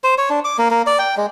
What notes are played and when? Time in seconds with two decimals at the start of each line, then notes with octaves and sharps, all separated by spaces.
0.04 C5
0.18 C#5
0.30 D4
0.45 D6
0.58 A#3
0.71 A#3
0.87 D5
0.99 G5
1.17 G#3